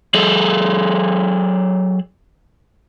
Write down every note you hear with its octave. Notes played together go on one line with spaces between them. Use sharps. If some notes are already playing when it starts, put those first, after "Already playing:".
F#3 G#4 A4